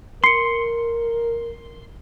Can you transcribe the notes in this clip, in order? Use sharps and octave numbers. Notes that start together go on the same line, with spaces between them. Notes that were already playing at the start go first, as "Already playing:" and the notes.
A#4 C6 C7 C#7